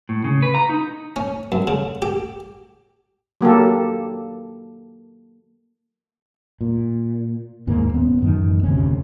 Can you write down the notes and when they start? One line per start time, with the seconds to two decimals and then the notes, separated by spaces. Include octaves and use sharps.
0.09 A2
0.24 C#3
0.42 B4
0.55 A#5
0.69 D#4
1.16 C#4
1.52 F#2
1.67 C#3
2.02 G4
3.41 F#3 A#3 G4 A4
6.61 A#2
7.67 D#2 G#2 A#3
7.94 D#1 B3 C#4
8.21 A1 F#2 D#3
8.63 F1 D2 C3 C#4